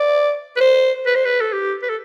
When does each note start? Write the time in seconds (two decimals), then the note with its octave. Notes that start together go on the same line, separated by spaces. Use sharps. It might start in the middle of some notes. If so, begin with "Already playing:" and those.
Already playing: D5
0.56 B4
0.60 C5
1.06 B4
1.15 C5
1.24 B4
1.41 A4
1.52 G4
1.82 B4
1.89 A4